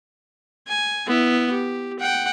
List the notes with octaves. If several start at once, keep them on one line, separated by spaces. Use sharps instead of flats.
G#5
B3 E4
G4
F#5 G5